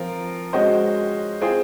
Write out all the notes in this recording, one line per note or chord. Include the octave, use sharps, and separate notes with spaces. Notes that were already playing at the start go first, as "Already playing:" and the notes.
Already playing: F3 C4 F4 A#4
G#3 C#4 F#4 C5 D#5
C4 F4 G#4 C5